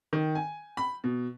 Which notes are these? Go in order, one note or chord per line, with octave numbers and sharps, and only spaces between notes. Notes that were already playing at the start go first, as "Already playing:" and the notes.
D#3
G#5
B5
B2